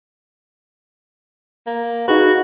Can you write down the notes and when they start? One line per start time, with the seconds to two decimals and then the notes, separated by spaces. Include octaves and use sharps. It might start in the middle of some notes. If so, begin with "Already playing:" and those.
1.67 A#3
2.08 D#4 F#4 G#4 B4